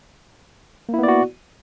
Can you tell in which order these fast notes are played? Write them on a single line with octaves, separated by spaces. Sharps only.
A#3 E4 B3 D5 F#4